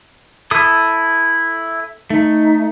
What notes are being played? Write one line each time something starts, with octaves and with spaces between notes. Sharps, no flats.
E4 A4 D#6
A3 D#4